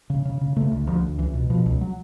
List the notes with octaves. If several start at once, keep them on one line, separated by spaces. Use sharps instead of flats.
C#3
C#3
C#3
C#3 A3
D2
D2 F3
D2
C#2 E3
B2
B2 F3
C#2
F#3